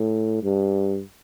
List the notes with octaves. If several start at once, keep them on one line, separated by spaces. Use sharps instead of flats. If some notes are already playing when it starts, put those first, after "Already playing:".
Already playing: A2
G2